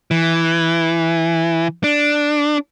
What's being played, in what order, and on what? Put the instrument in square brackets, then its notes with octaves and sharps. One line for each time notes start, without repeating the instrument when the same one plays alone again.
[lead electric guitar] E3
D4